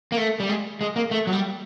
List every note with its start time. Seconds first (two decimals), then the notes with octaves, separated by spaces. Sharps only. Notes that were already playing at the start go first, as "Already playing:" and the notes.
0.12 A#3
0.17 A3
0.40 G3
0.49 G#3
0.81 G#3
0.96 A#3
1.11 A3
1.27 F#3
1.33 G3